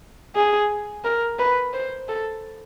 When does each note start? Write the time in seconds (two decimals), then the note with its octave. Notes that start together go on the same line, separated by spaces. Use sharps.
0.35 G#4
1.04 A#4
1.39 B4
1.73 C5
2.08 A4